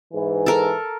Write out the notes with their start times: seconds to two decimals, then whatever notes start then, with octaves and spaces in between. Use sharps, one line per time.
0.13 G#2 E3
0.46 A4 A#4